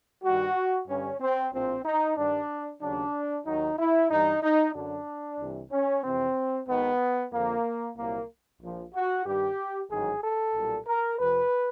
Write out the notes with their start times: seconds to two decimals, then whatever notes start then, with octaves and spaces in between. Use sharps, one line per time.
0.24 G2 D#3 G3 F#4
0.88 G2 D3 G3 C#4
1.20 C4
1.53 A#1 A2 F3 C4
1.85 D#4
2.17 G2 D#3 G3 D4
2.81 D#2 C#3 F#3 D4
3.46 D#2 D#3 F#3 D#4
3.79 E4
4.10 G2 E3 G3 D#4
4.43 D#4
4.75 F#2 D3 F#3 D4
5.40 C2 C3 E3 G3
5.71 C#4
6.04 F2 C3 E3 C4
6.68 G#1 G#2 D#3 B3
7.32 F2 D3 F3 A#3
7.97 C2 A#2 F#3 A#3
8.62 A#1 A#2 F3
8.94 F#4
9.26 G2 D#3 G3 G4
9.91 A1 G#2 D#3 F#3 G#4
10.23 A4
10.54 B1 A#2 G3
10.87 A#4
11.19 F2 C3 F3 B4